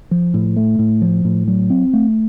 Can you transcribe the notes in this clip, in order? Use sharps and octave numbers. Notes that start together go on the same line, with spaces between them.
F3
A2
A3
A2
F3
A2
F#3
C4
A3